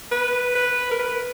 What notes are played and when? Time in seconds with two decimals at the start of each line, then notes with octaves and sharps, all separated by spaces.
0.12 B4
0.55 B4
0.91 A#4
0.99 B4